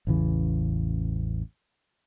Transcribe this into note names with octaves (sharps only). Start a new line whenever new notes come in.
A1 E2 C#3 E3